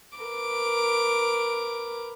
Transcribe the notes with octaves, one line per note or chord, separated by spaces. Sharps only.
A#4 B4 D6